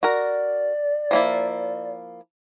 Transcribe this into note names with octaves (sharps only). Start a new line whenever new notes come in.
F#4 A#4 D5
F3 A#3 E4